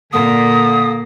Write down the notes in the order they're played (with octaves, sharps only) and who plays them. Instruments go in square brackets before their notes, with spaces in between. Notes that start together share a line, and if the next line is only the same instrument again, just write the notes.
[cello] A#2 A#3 [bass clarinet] D3 [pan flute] D#6